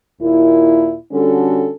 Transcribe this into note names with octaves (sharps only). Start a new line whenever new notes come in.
D#2 A#2 E4
D3 G3 C#4 F#4 A4